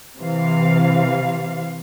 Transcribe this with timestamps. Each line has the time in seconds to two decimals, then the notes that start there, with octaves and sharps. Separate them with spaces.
0.19 C3 E3 F5